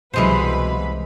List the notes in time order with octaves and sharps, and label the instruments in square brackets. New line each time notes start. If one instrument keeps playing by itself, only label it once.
[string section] C2 B4 B5 [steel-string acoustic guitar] B2 F#3 [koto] E3 G#3 C5